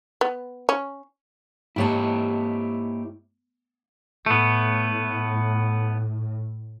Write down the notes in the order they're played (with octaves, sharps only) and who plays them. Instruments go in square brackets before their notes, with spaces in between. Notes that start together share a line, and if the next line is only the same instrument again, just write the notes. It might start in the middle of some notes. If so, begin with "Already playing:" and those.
[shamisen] B3
C#4
[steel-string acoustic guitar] G#2 A#3 A5 [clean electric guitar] E4 G4 C#5
[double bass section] A2 [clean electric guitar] A3 B3